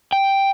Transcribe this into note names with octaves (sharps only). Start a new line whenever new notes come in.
G5